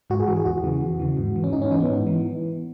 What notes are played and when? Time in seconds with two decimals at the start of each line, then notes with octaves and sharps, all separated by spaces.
0.10 G#2 F#4
0.20 G#4
0.28 E3 F#4
0.37 G#4
0.45 E2 F#4
0.64 C#3 E3
0.81 E2
1.00 C#3 E3
1.17 G#2
1.36 E3
1.44 C#4
1.53 G#2 D#4
1.62 C#4
1.71 E3 D#4
1.80 B3
1.90 G#2
2.07 E3